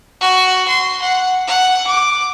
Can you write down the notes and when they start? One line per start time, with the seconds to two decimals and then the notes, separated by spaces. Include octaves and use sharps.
0.21 F#4
0.68 C6
1.02 F#5
1.48 F#5
1.87 D6